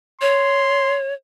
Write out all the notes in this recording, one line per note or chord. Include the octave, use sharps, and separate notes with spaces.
C#5 C6